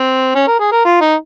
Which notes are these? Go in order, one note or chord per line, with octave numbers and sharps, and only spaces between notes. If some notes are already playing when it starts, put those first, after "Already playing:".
Already playing: C4
C#4
A#4
G#4
A#4
F4
D#4